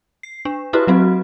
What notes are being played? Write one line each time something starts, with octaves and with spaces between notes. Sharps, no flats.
C7
D4
E4 F#4 G4 B4
F#3 C4 F#4